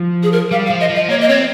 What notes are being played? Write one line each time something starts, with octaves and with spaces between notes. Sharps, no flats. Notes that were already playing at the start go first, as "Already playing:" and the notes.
Already playing: F3
G#4
A#4
G3 F5
F5
F3
D#5
F3
D#5
A#3 C#5
D#5
C4 C#5